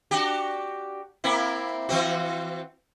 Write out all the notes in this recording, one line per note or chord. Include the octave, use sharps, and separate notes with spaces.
D4 F#4 G4
A#3 C4 E4
E3 C4 F#4